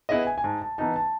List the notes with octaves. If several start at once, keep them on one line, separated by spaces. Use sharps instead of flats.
B3 E4 G#4 D#5 E5
G#5
G#5
G#2 A5
A5
E3 B3 D#4 A5
A5